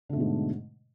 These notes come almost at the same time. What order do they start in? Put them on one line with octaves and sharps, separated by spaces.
D3 A3 B2 G#2